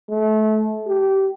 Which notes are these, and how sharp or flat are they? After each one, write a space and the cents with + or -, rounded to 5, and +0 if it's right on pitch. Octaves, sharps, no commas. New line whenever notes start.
A3 -30
G4 -20